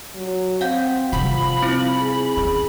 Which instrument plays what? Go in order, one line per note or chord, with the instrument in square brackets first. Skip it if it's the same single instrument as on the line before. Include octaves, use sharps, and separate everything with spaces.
[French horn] F#3
[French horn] C4 [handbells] F5 F#5 G6
[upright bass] C3 G3 [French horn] F3 [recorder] B5
[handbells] C4 E4 C5
[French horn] G#4
[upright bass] C#4